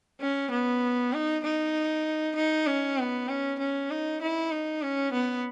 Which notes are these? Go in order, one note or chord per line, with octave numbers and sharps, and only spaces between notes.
C#4
B3
D#4
D#4
D#4
C#4
B3
C#4
C#4
D#4
E4
D#4
C#4
B3